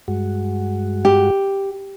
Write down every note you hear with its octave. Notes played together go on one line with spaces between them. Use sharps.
G2 G#3 F#4
G4